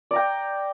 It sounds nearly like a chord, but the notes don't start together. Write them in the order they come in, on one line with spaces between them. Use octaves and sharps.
D5 A#5 G5